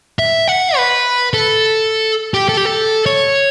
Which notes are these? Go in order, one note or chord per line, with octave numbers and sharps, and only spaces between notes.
E5
F#5
B4
A4
G4
A4
G4
A4
C#5